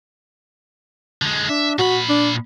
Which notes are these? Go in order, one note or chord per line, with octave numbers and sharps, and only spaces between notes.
D3 G#3
D4 E5
A#2 F#4 B5
D4